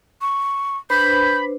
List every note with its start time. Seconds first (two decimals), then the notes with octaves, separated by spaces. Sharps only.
0.21 C#6
0.90 D4 B4 C5 B5 G6